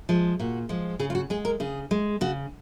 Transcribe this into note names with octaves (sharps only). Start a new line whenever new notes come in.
F3 G#3
A#2 F#4
F3 G#3
C#3 G#4
F4
F#4
G#3 G#4
A#4
C#3 G#4
G#3
C#3 F#4